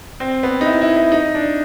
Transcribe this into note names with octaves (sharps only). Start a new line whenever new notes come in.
C4
B3
D#4
E4
E4
E4
D#4
D4